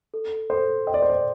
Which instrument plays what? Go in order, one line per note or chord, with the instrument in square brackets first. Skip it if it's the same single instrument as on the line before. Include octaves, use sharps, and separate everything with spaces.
[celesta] A4
[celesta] A4 [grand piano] C5
[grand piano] D#5 [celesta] G5
[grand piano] D5
C5
D5